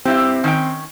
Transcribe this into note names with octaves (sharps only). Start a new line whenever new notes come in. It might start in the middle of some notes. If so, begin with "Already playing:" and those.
G2 C4 E4 G4
D#3 C#4 G5